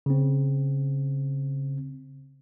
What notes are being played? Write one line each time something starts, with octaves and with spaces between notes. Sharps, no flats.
C#3 C4